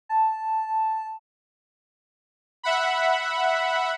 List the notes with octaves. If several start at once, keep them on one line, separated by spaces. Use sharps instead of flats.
A5
E5 F#5 B5